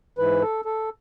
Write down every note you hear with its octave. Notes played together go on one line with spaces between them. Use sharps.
G#2 E3 B4
A4
A4